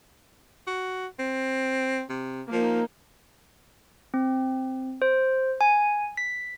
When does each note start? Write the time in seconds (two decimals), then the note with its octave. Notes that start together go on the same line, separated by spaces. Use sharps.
0.67 F#4
1.19 C4
2.10 C3
2.52 F3 A#3 D#4
4.14 C4
5.02 C5
5.61 G#5
6.17 B6